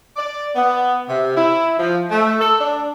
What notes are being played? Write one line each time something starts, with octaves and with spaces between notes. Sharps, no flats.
D5
B3
C3
E4
F3
A3
A4
D4